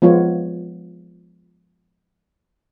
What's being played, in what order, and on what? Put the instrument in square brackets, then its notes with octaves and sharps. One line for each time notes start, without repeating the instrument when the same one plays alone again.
[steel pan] F3 G#3 B3 F4 C#5